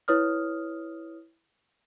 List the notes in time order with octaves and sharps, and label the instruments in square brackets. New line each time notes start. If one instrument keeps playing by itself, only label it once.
[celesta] E4 B4 C#5 D#6 F6